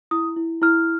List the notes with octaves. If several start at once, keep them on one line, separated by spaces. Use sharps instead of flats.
E4 D#6
E4
E4 F6